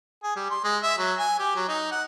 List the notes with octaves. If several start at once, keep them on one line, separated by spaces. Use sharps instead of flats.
G#4
G3
C6
G#3
E5
F#3
G#5
G4
F#3
D#4
F#5